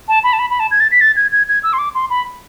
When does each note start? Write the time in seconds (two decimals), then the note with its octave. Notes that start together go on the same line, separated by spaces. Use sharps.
0.08 A5
0.24 B5
0.33 A5
0.39 B5
0.50 B5
0.60 A5
0.71 G#6
0.80 A6
0.91 B6
1.01 A6
1.16 G#6
1.32 G#6
1.48 G#6
1.63 E6
1.73 C6
1.78 D6
1.95 C6
2.10 B5